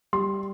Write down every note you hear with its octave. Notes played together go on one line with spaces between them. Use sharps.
G3 C6